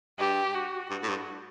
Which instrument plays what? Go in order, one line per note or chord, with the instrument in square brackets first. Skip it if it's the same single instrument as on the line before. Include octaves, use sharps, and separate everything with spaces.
[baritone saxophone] G2 [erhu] G4
[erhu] F#4
[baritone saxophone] G2 [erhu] F#4
[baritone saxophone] A2
G2